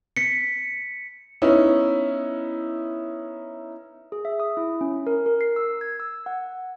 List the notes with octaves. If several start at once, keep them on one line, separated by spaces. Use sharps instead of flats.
B6 C#7
B3 C#4 D#4 E4
G#4
E5
D#6
E4
C#4
A#4
A#4
C7
E6
G#6
E6
F#5